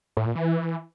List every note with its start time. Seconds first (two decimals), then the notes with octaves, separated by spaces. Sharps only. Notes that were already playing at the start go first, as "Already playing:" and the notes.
0.17 A2
0.26 A#2
0.35 E3